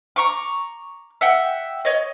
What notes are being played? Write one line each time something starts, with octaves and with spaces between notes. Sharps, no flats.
A#5 C#6 D6
E5 F#5 G5
C#5 D#5